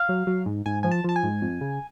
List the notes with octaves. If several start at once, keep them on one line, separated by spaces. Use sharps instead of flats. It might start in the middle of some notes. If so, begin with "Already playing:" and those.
Already playing: F5
F#3
F#3
G#2
G#2 G#5
F3 G#5
A5
F3 A5
G#5
G#2
F2
C#3